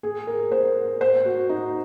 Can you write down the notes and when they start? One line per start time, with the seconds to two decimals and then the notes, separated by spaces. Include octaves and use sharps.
0.03 G#4
0.27 A#4
0.51 C5
1.01 C5
1.25 F#4
1.49 D#4